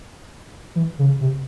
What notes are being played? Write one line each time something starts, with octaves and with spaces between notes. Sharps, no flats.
E3
C#3
C3